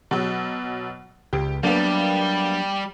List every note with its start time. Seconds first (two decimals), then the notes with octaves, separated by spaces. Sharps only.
0.11 B2 F#3
1.33 C#2 G4
1.63 F#3 G3 A#3 B3 D4